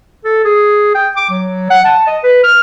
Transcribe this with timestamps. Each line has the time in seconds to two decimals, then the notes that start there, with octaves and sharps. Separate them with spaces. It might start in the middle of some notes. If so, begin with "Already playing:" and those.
0.24 A4
0.45 G#4
0.95 G5
1.16 D6
1.30 F#3
1.70 F#5
1.85 A5
2.07 D#5
2.23 B4
2.44 F6